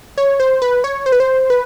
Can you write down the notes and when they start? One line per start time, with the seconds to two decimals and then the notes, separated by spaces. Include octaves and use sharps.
0.18 C#5
0.40 C5
0.62 B4
0.84 C#5
1.06 C5
1.12 B4
1.20 C5
1.50 B4